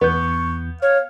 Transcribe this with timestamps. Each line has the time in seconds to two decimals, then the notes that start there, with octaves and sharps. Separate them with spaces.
0.01 E2 B3 C#6 G6
0.82 C#5 F5